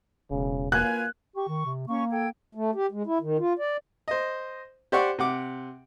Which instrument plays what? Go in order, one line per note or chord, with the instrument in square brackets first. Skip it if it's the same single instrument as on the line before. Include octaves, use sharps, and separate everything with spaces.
[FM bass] E1 [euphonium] C#3
[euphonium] A#3 [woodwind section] F4 B4 G#5 [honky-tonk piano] F#6
[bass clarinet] G4 [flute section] C#6
[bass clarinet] D#3
C3
[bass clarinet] A#3 [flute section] C#4 C#6
[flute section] A4 G5 G#6
[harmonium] A3
G4
G#3
E4
D#3
F4
D5
[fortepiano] C5 D#5
G4 C5 D5 F#5 C#6
C3 F#5 D6